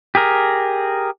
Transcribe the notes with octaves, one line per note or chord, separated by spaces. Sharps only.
G4 G#4 A#4